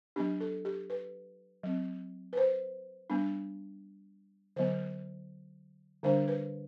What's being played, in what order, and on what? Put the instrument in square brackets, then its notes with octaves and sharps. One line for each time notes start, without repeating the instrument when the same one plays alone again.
[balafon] F#3 B3 D4 G4
A4
G4
B4
F#3 C4
B4
C5
G3 B3 D4
D3 F#3 B3 C5
D3 G3 D4 C5
B4